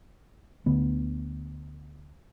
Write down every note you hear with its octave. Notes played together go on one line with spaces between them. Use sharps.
D2 D3 B3